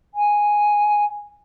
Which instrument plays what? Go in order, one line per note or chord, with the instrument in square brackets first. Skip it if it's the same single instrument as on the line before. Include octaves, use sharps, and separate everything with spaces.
[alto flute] G#5